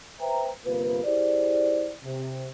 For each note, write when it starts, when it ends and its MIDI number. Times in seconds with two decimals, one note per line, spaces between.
0.21 0.50 71
0.21 0.50 72
0.21 0.50 76
0.21 0.50 79
0.21 0.50 82
0.66 1.02 31
0.66 1.02 48
0.66 1.02 58
0.66 1.02 65
0.66 1.02 71
1.05 1.92 64
1.05 1.92 67
1.05 1.92 68
1.05 1.92 72
1.05 1.92 74
2.05 2.49 48